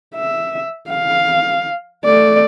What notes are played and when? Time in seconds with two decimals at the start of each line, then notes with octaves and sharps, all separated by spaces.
0.15 E5
0.89 F5
2.05 A3 D5